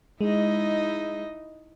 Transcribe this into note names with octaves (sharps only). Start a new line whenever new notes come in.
G#3 D#4 E4 D#5